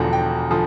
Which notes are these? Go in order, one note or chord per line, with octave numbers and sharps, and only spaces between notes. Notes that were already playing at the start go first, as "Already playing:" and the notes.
Already playing: E1 E2 D3 F3 A#5
G5
D3 F3